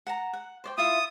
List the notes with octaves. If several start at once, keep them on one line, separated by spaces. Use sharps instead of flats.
F#5 A5 A#5
F#5
C5 D5 G5
E4 F4 E5 D#6